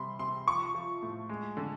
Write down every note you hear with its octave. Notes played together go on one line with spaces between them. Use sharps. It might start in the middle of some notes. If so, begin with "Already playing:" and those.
Already playing: C3 G3 B5 C6
C3 C6
F3 C#6
F3
A2
G#3
D3